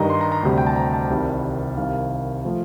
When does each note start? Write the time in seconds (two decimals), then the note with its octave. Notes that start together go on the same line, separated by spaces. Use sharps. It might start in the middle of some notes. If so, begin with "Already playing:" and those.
Already playing: G2 D#3 G3 D#5 A#5
0.10 C6
0.21 A#5
0.32 A#5
0.43 D2 C3 G3
0.58 G5
0.67 A5
0.76 A#5
0.94 A5
1.10 C2 C3 D#3 G3
1.77 C2 C3 D#3 F5
2.45 F3 A3